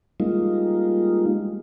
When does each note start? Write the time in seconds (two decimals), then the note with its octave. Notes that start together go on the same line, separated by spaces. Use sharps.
0.20 G3 G#3 A#3 D#4 F4